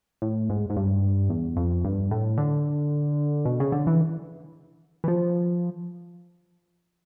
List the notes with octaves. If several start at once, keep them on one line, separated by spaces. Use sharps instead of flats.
A2
G#2
G#2
G2
E2
F2
G2
A2
D3
B2
C#3
D3
E3
E3
F3